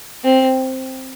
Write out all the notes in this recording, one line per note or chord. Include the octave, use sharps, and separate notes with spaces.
C4